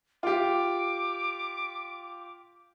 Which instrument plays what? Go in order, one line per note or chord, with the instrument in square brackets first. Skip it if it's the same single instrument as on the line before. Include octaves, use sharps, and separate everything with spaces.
[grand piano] F4 G4 [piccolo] D6